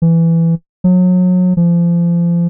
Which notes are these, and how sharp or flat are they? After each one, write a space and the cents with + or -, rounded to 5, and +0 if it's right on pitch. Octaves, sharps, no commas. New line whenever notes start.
E3 +10
F#3 -30
F3 -30